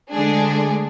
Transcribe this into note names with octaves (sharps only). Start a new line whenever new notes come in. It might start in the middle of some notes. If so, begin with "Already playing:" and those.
D2 D3 G#3 D4 G#4